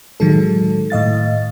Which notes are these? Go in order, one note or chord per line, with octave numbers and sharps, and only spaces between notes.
A2 D#3 F#3 G#3 A4
A2 D#5 F5 A6